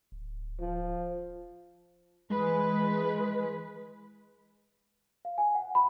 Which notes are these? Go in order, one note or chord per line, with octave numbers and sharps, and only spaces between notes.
D1
F3
E3 G#3 B4
F5
G#5
F#5
B5